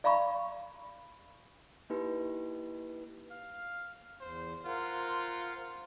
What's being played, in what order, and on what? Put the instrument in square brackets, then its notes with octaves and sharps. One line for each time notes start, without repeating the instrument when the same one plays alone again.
[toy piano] D5 F5 A#5 B5 C#6
[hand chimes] A#3 D#4 E4 G4 B4
[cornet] F5
[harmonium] E2 [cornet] C5
[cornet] F4 [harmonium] A#4 C5 F#5